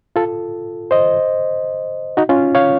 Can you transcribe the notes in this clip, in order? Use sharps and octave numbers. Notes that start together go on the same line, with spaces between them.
F4 A4
C5 D#5
D#4 F#4
C#4 F4
C#5 F5